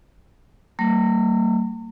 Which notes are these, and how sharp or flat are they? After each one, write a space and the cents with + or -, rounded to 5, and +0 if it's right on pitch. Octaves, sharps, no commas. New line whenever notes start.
G3 -40 A#3 -40